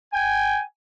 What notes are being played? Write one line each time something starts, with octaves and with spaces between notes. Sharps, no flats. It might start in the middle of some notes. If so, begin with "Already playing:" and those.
G5 G#5